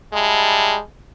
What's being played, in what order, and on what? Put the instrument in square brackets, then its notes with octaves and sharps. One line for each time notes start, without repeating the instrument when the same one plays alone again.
[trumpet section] G3 E4 A5 [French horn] G#3